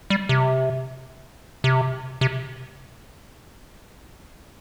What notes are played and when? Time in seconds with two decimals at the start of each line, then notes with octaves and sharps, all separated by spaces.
0.10 G3
0.29 C3
1.64 C3
2.21 C3